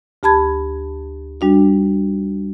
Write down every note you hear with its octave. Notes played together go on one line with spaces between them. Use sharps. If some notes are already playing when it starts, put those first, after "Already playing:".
D2 G4 A5 B5 G#6
G3 D4 F#4